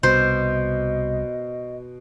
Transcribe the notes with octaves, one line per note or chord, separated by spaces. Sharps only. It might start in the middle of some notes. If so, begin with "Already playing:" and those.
C2 B2 C5 D#5